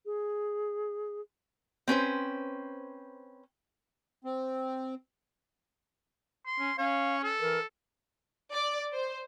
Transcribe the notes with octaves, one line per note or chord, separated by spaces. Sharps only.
G#4
C4 C#4 B4 C5
C4
C6
C#4
C#4 C#5 F5
A4
E3 A#4
D5
C5